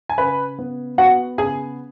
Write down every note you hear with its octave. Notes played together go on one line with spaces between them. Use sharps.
G#5
C#3 B4 B5
B3
B3 F#4 F#5
C#3 G#4 G#5